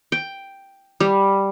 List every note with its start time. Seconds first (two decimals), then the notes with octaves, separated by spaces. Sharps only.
0.12 G5
1.00 G3